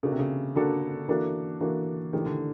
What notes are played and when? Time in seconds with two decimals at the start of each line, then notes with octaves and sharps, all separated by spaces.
0.03 C#3 A#3 D4 F#4 A4
0.11 C3
0.19 C#3
0.55 D3 A#3 D4 F#4 A4
1.08 E3 A#3 D4 F#4 A4
1.61 E3 A#3 D4 F#4 A4
2.13 D#3 E3 A3 D4 G4
2.26 D3